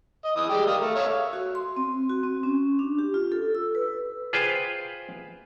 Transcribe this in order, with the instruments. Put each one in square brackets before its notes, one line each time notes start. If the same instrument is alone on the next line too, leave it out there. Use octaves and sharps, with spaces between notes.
[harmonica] D#5
E3 D#6
G3 G#3 G4
A#4 F5 D#6
A3
C#5 E5 F5
[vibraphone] F#4
C6
C4
F#4
C4
C#4
D4
G4
F4
A4
E6
B4
[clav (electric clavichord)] F4 G#4 B4 C5 F5 G5